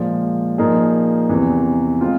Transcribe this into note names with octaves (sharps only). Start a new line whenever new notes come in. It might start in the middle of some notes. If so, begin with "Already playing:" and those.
Already playing: A#2 F3 G#3
A#2 F3 A#3 D#4 G#4
E2 C3 E3
G#3 C4 F4